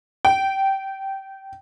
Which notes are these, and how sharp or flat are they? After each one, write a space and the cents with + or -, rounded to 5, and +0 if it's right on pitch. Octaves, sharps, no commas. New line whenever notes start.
G5 -15